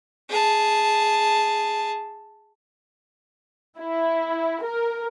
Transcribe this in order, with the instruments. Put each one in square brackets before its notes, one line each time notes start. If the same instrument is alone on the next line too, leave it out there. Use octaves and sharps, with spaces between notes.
[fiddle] G#4 A5
[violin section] E4
A#4